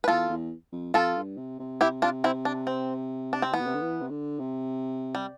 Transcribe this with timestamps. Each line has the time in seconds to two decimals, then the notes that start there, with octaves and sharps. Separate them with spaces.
0.04 B4
0.08 E2 F4 A4
0.29 E2
0.72 F2
0.94 F2 F4 A4
1.16 G2
1.37 C3
1.60 C3
1.81 E4 G4
2.02 D4 F4
2.24 C4 E4
2.45 D4
2.67 C4
3.33 D4
3.42 C4
3.53 E3 B3
3.60 B2
3.67 C3
3.74 D3
3.82 E3
4.01 C3
4.10 D3
4.39 C3
5.15 G3